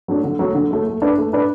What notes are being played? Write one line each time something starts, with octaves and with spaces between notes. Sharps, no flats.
F#3 A3 D4
D3
F#3 A3
D3
F#3 A3
A3
D4 B4 D5
A3
D4 B4 D5